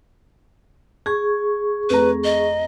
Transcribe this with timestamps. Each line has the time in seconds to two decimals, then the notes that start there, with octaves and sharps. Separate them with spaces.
1.06 G#4 C#6 G#6
1.90 F2 A3 B4 A#5
2.24 D#5